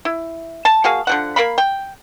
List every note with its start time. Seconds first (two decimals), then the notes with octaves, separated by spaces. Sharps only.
0.05 E4
0.65 A5
0.84 A#3 F#4 G#4 F5
1.07 D3 F3 F#5
1.36 A#3 A#4 F5 B5
1.58 G5